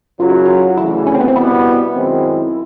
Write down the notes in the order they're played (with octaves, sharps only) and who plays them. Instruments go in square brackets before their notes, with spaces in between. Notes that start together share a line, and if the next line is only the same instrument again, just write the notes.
[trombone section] F#2 C#3 F#3 [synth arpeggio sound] F4
[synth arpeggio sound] E4
F4
[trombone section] D2 C#3 E3 [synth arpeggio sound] E4
[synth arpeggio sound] C#4
C4
B3
C4
[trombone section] C2 B2 G3 B3 [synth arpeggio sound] E4
[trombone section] F#2 D#3 G#3 C4